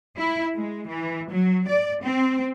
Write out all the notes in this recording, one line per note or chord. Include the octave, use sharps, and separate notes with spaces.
E4
G#3
E3
F#3
D5
C4